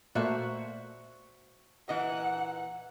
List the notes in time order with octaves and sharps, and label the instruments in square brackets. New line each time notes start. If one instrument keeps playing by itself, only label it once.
[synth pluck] A#2 A3 A#3 [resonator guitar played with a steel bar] F#4 C5 E5
[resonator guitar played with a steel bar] A#2 E3 [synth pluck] D#5 [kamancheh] F#5